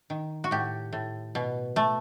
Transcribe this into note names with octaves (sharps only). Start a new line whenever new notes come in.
D#3
F#4
A2 G4
A2
B2
A3